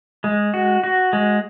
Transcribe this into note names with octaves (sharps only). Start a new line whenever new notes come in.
G#3
F#4
F#4
G#3